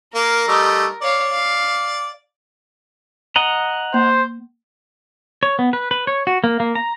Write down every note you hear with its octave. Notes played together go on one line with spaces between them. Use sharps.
A#3 A#4
G3 A3 D#4
C#5 D5 F5
F5
D#5 F#5 A#5
A#3 C5
C#5
B3
B4
B4
C#5
F#4
A#3
A#3
A#5